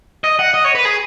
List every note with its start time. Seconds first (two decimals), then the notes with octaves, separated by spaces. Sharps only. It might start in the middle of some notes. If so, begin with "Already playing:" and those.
0.24 D#5
0.39 F#5
0.54 D#5
0.65 C#5
0.75 B4
0.85 G#4